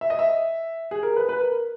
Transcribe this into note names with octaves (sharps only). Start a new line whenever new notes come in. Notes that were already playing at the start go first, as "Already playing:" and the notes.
E5
D#5
E5
G#4
A#4
B4
B4
A#4